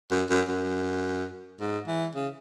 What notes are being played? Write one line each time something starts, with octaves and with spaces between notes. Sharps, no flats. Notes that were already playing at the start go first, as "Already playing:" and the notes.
F#2
F#2
F#2
G#2
E3
C#3